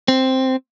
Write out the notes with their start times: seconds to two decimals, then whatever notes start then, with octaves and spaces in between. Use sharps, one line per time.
0.08 C4